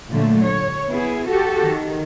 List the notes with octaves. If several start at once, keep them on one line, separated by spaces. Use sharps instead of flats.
A#2 D3 F#3 A3
C#5
B3 E4 G#4
F#4 G4 A4
D#3